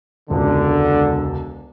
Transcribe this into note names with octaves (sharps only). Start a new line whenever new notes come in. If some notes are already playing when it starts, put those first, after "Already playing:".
E1 C#2 D3